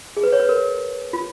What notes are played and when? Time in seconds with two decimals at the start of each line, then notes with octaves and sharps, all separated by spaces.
0.17 G#4
0.23 B4
0.32 C#5
0.40 B4
0.49 A#4
1.13 F4